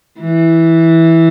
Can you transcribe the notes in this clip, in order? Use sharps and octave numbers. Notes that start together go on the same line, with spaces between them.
E3